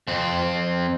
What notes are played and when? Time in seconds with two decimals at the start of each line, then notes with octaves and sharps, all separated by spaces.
0.07 F2 C4